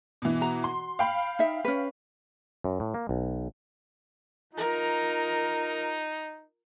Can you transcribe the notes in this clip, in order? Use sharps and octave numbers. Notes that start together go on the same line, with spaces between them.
B2 E3
F#4 A#5
C6
F5 G5 B5
D#4 E5
C#4 B4
F#2
A2
A#3
B1
D#4 F4 A#4